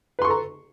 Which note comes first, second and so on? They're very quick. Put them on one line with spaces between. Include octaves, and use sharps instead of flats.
B4 C6 C#6 A4 A#5